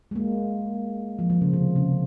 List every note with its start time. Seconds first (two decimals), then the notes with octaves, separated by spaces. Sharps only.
0.11 G#3
0.15 A#3
1.19 F3
1.30 F3
1.41 C#3
1.53 C3
1.76 C#3